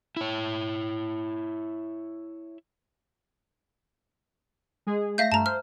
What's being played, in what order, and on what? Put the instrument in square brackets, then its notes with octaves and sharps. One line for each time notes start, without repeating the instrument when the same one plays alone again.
[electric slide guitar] E4 C#5
[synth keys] G#3 G#4
[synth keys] A3 A#6 [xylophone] E5 F5 G6
[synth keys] G2 A3 F6 [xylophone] A5 A#5
[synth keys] C5 [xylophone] F6